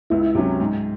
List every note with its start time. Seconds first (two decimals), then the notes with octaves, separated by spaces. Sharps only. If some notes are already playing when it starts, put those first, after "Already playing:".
0.10 C#2 E4
0.35 C3 F#3 C#4
0.60 G#2